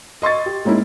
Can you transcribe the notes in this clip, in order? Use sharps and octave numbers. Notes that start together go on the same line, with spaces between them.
D#5 C6 C#6 A6
G4
G#3 A#3 C#4 D#4 E4